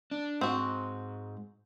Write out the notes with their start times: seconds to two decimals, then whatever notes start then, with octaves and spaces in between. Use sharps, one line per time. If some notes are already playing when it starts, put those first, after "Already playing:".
0.11 D4
0.41 G#2 C4 F#4